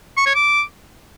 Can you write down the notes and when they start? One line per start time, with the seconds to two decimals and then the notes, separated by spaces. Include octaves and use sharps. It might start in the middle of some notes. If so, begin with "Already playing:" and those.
0.17 C#6
0.26 C#5
0.35 D6